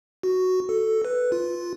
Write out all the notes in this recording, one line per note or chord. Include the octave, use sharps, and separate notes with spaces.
F#4
A4
B4
F4